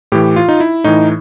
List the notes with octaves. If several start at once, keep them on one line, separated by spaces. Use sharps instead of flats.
A2 E3 G4
F4
D#4
E4
A2 E3 D#4